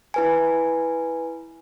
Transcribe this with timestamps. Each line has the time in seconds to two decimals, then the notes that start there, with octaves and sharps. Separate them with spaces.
0.14 E4 B4 G#5